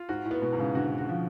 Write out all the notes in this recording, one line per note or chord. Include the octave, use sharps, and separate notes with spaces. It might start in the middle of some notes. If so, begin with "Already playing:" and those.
Already playing: F4
G#2 F#4
A2
B3
B2
G#2
C#3
D3 F#4
F#4
F3